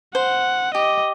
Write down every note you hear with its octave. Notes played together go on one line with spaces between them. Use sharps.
C5 F#5
G4 D#5